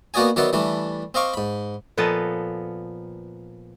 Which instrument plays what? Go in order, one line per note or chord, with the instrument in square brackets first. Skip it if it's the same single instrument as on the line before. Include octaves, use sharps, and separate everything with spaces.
[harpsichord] A#3 B3 F#4 D5 D#5 G#5
D#3 F#3 B3 D5 E5 F#5
E3 G3 A3 D4
C4 D#5 F5 C#6 D6
G#2 B5
[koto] A#2 F3 B3 A4 D#5 A5